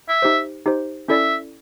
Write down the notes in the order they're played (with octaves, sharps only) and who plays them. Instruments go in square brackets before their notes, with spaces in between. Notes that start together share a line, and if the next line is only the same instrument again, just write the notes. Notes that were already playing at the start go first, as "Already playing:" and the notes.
[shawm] E5
[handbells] D#4 G4 C5
D#4 G4 C5
[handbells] C#4 E4 A4 D5 [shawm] E5